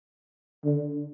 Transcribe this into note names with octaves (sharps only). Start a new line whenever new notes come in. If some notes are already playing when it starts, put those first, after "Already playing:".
D3